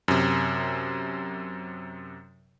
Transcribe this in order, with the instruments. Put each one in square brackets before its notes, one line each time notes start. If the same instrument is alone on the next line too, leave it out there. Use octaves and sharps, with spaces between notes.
[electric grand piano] F#2 C3